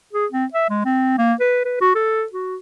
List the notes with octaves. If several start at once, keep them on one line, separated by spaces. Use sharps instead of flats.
G#4
C4
E5
G#3
C4
A#3
B4
B4
F#4
A4
F#4